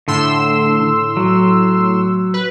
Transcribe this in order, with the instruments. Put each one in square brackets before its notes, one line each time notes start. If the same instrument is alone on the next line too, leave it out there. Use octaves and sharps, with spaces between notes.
[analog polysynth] A2 C6 E6 [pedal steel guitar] D3
[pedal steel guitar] F#3
[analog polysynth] B4